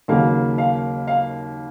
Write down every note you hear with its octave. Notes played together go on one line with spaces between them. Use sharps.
D#2 C#3 F#3 A#3 F5
F5
F5